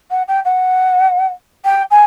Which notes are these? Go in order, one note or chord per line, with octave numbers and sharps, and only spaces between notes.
F#5
G5
F#5
G5
G#5